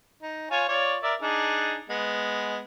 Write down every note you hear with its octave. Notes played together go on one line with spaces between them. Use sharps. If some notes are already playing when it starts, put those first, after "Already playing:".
D#4
F4 C#5 G#5
F4 C#5 D5
A#4 D5 E5
D4 D#4 G#4
G#3 B3